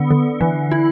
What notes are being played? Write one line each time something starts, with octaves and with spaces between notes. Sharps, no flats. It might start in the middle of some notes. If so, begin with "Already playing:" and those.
Already playing: D3 B3
D3
E3
E4